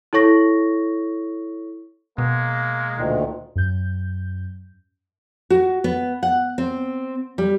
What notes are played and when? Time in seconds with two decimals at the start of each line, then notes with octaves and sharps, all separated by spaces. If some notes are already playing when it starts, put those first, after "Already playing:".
0.13 E4 A4 C#5 C#6 A#6
2.18 B2 G#3 A#3
2.97 D2 A#2 D#3
3.56 F#2 G6
5.50 F#4
5.84 B3
6.23 F#5
6.58 C4
7.38 G3